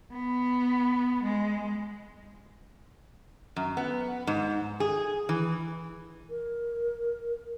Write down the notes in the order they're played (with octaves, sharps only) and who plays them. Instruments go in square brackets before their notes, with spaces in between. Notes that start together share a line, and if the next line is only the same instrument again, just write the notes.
[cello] B3
G#3
[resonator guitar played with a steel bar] F#2
B3
G#2
G#4
E3
[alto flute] A#4